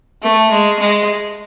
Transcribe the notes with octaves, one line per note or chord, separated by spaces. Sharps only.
A3
G#3
G#3